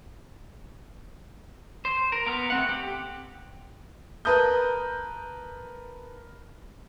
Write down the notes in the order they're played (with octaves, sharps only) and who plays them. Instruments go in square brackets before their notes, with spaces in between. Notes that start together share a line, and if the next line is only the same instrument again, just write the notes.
[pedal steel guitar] C5
A#4
B3 A#5 F6
A3 C4 F#5
G4
[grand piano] A#4 B4 A5 A#5 D#6 G6